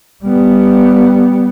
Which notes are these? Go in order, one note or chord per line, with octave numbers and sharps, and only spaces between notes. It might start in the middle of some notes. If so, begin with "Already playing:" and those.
G3 B3